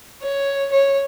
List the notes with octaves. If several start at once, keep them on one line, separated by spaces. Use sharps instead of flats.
C#5
C#5